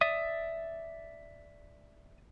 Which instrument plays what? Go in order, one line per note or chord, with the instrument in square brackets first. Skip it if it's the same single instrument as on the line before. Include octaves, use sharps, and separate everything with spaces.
[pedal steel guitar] D5 E5 D#6